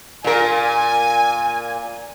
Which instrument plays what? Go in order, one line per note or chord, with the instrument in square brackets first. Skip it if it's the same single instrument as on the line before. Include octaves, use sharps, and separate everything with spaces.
[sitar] A#2 A#4 [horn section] G#5